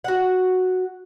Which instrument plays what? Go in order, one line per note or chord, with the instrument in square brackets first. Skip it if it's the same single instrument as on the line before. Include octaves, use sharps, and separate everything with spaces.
[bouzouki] F#4 F#5